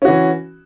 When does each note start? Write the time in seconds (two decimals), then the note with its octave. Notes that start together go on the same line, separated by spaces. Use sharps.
0.02 C#4
0.05 F#4
0.08 E3